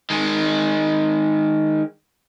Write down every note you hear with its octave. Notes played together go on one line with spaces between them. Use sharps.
D#3 G#3